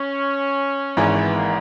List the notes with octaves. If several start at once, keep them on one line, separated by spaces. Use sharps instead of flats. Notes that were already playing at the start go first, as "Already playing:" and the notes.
Already playing: C#4
G#1 G#2 E3 C#4
B3
A#3